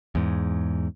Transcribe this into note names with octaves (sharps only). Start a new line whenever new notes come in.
E2 G#2